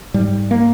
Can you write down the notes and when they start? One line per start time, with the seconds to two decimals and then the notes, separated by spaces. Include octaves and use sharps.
0.14 G#2 G3
0.51 A#3